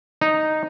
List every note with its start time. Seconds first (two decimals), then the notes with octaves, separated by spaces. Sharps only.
0.21 D#4